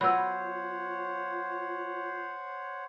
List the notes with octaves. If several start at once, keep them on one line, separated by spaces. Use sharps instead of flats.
F#3 B3 F4 C5 C#5 F#5 B5 E6